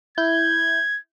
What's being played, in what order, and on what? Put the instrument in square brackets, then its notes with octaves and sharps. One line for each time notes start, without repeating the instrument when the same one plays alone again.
[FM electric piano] E4 G6 [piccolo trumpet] G#6